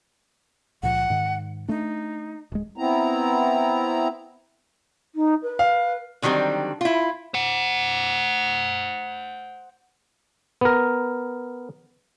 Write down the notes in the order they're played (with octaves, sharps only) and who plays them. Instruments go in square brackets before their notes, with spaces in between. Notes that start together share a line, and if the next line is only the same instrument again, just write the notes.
[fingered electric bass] C#2 A#2 F3 [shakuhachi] F#5
[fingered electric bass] G#2 D#3
[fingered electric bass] A3 D4 [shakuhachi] D#4
[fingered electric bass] D1 G#3
[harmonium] B3 C4 E4 A#5
[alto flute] D#4
B4
[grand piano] F5
[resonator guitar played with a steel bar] D3 D#3 F#3 G3 C4
E4 F4
[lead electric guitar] C5 F#5
[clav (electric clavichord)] B3 A#4